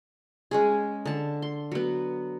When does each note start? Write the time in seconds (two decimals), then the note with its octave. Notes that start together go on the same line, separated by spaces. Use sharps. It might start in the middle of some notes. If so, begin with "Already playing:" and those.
0.51 G#3 C#4 G#4
1.05 D3 A5
1.42 C6
1.72 F#3 B3